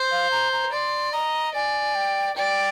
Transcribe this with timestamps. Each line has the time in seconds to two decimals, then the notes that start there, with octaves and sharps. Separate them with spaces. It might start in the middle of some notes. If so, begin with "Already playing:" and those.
Already playing: C5
0.12 F5
0.31 A#5
0.52 A#5
0.73 D5 C6
1.13 D#5 A#5
1.54 D5 G#5
1.95 G5
2.36 D5 G5